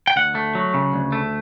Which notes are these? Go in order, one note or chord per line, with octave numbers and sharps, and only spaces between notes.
G5
D2 F#5
A3
F#3
C#3
D2
A3